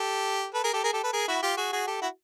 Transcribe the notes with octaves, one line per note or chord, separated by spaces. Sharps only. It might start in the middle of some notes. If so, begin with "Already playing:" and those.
Already playing: G4 A4
A4 B4
G#4 A#4
G4 A4
G#4 A#4
G4 A4
A4 B4
G#4 A#4
E4 F#4
F4 G4
F#4 G#4
F#4 G#4
G4 A4
E4 F#4